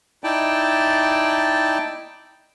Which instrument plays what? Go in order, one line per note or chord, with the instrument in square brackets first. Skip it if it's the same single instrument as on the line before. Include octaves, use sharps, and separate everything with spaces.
[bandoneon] D#4 E4 D5 G5 A5